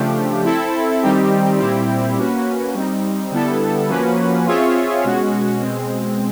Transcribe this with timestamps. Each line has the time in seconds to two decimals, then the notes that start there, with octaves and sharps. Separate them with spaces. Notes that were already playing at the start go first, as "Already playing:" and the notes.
Already playing: C#3 F3 A3 D4 G4
0.45 C4 E4 A4
1.02 D#3 G3 C4 D#4 G4
1.59 A#2 G3 C4 E4 G4
2.16 A#3 C#4 F#4 B4
2.74 G3 C4 D#4
3.31 D3 G3 B3 E4 A4
3.88 F3 A#3 C#4 F#4 B4
4.46 C4 F4 G#4 C#5 E5
5.04 B2 G#3 C#4 F#4
5.61 B2 G#3 C4